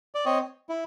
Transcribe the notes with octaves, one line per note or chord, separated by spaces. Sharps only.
D5
C4 C#5 D#5
E4